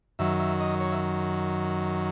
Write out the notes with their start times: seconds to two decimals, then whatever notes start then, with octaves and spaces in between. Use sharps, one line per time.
0.19 F#2 D#3 F#3 E5
0.40 E5
0.60 D#5
0.80 C#5
0.92 E5